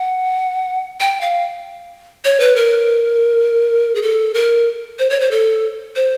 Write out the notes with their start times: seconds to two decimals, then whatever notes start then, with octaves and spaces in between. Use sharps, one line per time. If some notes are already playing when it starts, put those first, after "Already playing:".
Already playing: F#5
1.00 G5
1.21 F5
2.25 C#5
2.40 B4
2.56 A#4
3.95 G#4
4.02 A4
4.34 A#4
4.99 C5
5.10 C#5
5.20 C5
5.31 A4
5.96 C5